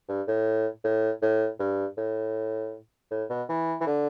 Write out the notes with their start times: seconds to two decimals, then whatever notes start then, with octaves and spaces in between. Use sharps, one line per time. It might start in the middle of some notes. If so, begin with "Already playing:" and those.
0.08 G2
0.27 A2
0.84 A2
1.22 A2
1.59 G2
1.97 A2
3.11 A2
3.30 B2
3.49 E3
3.81 E3
3.86 D3